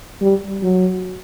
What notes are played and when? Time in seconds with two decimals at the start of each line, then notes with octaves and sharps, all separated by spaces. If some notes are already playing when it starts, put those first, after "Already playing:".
0.21 G3
0.63 F#3